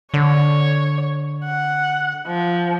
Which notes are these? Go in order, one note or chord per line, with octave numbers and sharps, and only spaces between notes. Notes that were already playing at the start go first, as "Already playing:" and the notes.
D3 C#5
F#5
F3